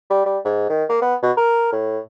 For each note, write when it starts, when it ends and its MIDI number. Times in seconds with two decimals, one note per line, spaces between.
0.10 0.24 55
0.26 0.38 55
0.45 0.68 44
0.69 0.84 51
0.89 0.97 58
1.02 1.15 59
1.22 1.31 47
1.37 1.71 70
1.72 1.99 45